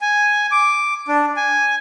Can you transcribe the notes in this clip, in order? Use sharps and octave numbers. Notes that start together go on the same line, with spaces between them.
G#5
D6
D4
G#5